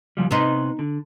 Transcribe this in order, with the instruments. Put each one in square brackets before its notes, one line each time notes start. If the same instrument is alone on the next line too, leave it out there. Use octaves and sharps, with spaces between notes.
[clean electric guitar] C#3 F3 G3
[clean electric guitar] C3 B4 C6 [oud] B3 D#4
[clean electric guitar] D3